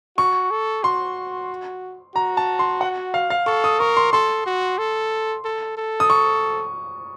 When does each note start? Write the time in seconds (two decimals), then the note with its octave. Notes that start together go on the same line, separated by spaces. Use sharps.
0.17 F#4 C#6
0.50 A4
0.83 F#4 C6
2.15 F#4 A#5
2.37 A5
2.59 C6
2.81 F#5
3.14 F5
3.30 F5
3.46 A4 C#6
3.64 D#6
3.79 A#4 C#6
3.97 C6
4.13 A4 C6
4.46 F#4
4.78 A4
5.45 A4
5.77 A4
6.00 D#6
6.10 C#6